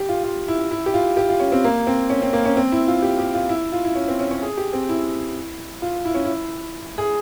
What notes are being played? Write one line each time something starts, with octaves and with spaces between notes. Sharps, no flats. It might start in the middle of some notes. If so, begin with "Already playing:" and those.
Already playing: G4
F4
F4
E4
E4
G4
F4
G4
F4
C#4
C4
A#3
C4
C#4
C4
A#3
C#4
C4
E4
F4
G4
G4
F4
E4
F4
E4
C#4
C4
C#4
C#4
G#4
G4
C4
E4
F4
E4
C#4
E4
G#4